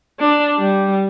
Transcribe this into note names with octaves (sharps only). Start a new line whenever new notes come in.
D4
G3